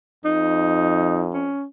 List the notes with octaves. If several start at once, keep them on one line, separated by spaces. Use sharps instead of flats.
F2 D#4
C#4